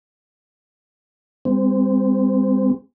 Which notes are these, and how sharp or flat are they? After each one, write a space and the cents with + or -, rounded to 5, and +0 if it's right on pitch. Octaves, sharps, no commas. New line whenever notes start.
G3 +40 C4 -20